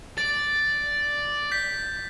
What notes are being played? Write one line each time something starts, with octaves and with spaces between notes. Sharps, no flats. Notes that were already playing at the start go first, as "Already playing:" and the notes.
D5 A6
G6 B6